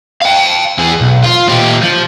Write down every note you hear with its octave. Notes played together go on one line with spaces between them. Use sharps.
F5 G5
E2 G#4
B1
F4
A#2 G4
F3